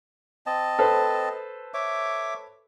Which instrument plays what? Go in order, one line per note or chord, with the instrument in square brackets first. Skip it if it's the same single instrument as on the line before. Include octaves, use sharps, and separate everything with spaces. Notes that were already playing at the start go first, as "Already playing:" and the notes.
[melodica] C4 D#5 A5
[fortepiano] A4 B4 C5
[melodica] C#5 E5 D6